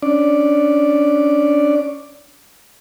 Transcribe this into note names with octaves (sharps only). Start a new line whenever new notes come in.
C#4 D4 D5